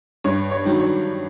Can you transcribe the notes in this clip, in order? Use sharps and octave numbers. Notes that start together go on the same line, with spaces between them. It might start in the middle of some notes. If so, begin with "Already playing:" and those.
G2 C#5
C#5
D#3 F#3
C#5